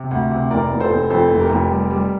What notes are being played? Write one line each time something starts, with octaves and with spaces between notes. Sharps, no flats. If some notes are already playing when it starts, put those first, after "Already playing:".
Already playing: C3
D2
C3
F1 A#4 D5
F1
A4 C5
F1
F2 A4 C5
F1
G4 A#4
F1
G3
G3